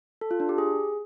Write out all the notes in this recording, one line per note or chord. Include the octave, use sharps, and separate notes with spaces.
A4
F4
D4
G4
G#4